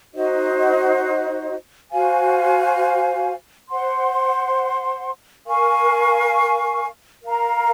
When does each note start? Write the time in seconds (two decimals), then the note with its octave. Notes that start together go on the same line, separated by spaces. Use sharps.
0.13 D#4 F#4 C5 D#5
1.91 F#4 C5 F5 G#5
3.69 C5 F#5 C6
5.46 A#4 F5 G#5 C#6
7.23 A#4 F5 A#5